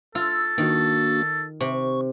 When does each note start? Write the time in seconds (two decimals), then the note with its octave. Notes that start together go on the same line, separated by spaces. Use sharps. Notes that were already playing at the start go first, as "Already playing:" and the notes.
0.15 F4 A4 E6
0.58 D#3 A#3 D4 F#4
1.61 C3 C#6